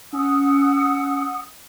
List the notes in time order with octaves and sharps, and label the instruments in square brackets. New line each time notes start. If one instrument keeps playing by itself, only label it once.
[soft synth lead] C#4 [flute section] F#5 D#6 E6